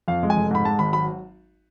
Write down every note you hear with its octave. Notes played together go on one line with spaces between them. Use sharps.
F2 F5
G#3
G#5
F1
G#2 B5
G#3 A5
G#1 B5
F#3 B5